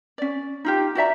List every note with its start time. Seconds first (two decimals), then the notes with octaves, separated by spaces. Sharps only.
0.18 C#4 D5
0.65 D#4 F4 G4
0.95 F#4 D5 E5 A#5